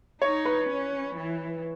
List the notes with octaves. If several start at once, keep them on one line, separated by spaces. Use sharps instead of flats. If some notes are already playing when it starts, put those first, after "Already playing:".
D#4 C#5
B4
C#4
E3